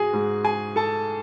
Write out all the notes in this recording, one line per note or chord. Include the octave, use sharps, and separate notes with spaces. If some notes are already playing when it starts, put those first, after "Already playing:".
Already playing: G#2 G#3 F#4 G#4 G#5
G#2 G#3
G#4 G#5
A4 A5